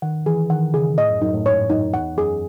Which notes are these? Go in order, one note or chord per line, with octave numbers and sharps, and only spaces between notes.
D#3 F#5
E3 G#4
D#3 F#5
C#3 G#4
A2 D#5
F#2
F#2 D#4
A2
G#2 C#5
F#2 D#4
E2 F#5
F#2 G#4